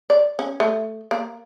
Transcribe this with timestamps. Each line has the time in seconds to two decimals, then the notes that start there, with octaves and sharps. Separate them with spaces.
0.10 D5
0.39 C#4
0.60 A3
1.11 A#3